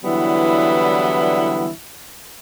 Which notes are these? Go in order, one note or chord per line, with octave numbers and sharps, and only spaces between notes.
D3 E3 F#3 G3 B3 E4